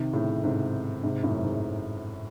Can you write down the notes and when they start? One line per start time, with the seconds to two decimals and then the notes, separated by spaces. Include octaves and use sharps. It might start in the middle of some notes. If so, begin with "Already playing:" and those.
Already playing: C3 D#3
0.13 A2 C#3
0.44 G#2 C3
1.03 G#2 C3
1.23 F#2 A2
1.44 G#2